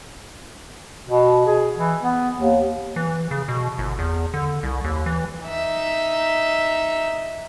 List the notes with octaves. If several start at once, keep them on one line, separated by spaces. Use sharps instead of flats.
B2
G#4
E3
B3
D#2
E3
C#3
B2
G1
E2
D3
C2
D#2
E3
D#4 E5